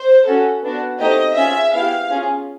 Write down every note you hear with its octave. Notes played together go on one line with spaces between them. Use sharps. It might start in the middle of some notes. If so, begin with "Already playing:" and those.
Already playing: C5
C#4 F#4 A4
B3 D4 F#4
A3 C4 D#4 G4 D#5
C#4 F4 G#4 E5
B3 E4 G4 F5
C#4 F4 G#4